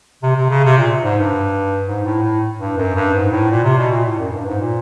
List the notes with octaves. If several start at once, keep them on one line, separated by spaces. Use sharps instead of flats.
C3
C3
C#3
C3
A#2
G#2
G2
G#2
A2
A2
G2
F#2
G2
G#2
A2
A#2
C3
B2
A#2
A2
F#2
G2
G#2
A#2